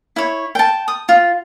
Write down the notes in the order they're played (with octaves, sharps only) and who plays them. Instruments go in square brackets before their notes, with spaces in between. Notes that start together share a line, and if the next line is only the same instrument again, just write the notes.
[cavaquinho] E4 C#5
G5 A5
D#6
F4